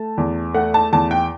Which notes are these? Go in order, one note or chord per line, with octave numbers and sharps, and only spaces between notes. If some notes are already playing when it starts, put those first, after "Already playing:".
Already playing: A3 A5
E2
A3 F#5
A5
E2 A5
G5